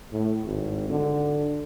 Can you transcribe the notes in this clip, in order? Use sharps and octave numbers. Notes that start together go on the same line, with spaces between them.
A2
G#1
D3